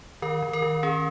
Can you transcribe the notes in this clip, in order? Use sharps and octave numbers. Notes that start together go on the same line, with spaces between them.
D#3 A#4
D#3
A#4
D#3
C#4 G#4